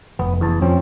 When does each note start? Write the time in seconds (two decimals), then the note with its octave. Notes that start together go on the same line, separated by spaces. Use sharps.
0.19 F1 B3
0.41 E2 A5
0.61 F2 F3 C4 C#4